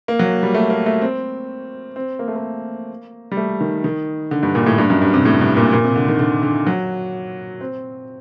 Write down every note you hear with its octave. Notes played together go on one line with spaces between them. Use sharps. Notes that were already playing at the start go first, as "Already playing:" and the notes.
A#3
F#3
G3
A3
A#3
A3
C4
C4
A#3
A3
A#3
G3
A3
D#3
D#3
D3
G2
A#2
A2
G2
F#2
G2
C3
A2
G2
A#2
A#2
C3
D3
D#3
D3
D3
F#3
C4